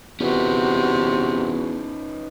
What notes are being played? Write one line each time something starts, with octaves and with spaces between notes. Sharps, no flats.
E2 C3 C#4 D#4 F#4 B4